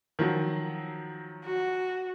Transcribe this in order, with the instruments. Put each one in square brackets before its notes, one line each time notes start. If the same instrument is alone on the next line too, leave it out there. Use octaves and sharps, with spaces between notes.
[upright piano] D#3 F3 F#3
[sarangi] F#4